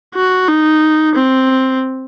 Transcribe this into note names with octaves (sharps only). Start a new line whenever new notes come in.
F#4
D#4
C4